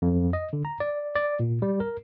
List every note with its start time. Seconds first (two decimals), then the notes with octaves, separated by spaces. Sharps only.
0.02 F2
0.33 D#5
0.53 D3
0.65 A#5
0.80 D5
1.15 D5
1.39 A#2
1.62 G3
1.80 A#4